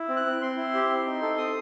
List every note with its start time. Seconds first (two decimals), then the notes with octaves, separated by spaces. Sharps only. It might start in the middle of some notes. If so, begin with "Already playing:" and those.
Already playing: E4
0.09 C4
0.17 F#6
0.25 C4
0.41 C4 C6
0.57 E4
0.74 G4
0.90 C4
1.06 D#4
1.22 A4
1.38 C4 D#6